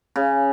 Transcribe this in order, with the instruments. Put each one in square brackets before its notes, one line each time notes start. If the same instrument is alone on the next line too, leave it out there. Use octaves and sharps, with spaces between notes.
[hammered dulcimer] C#3